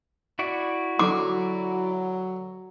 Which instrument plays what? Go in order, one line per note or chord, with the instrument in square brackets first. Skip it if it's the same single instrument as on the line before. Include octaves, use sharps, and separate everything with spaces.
[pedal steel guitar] E4 F#4 D5
[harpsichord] D3 [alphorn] F#3 [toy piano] D6